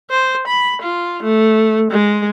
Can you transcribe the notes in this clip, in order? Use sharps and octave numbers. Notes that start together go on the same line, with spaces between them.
C5
B5
F4
A3
G#3